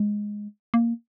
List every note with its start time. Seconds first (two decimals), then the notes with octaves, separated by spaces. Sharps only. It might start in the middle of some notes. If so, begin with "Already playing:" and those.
Already playing: G#3
0.74 A#3